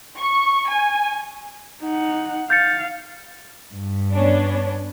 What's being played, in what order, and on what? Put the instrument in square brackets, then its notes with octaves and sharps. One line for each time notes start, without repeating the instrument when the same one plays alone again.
[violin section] C#6
G#5
[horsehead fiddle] D#4 F#5
[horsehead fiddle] F5 [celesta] G6 A6 C#7
[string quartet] G2
[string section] B3 C#4 D4